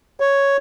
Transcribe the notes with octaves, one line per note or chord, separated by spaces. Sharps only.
C#5